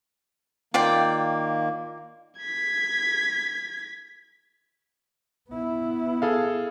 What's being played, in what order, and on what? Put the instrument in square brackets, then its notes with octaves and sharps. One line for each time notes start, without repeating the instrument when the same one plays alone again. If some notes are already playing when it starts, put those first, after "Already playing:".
[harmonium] D#3 A#3 [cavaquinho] F4 D5 G5
[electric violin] G#6 B6
[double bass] B3 E4
[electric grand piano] G#4 A4 F5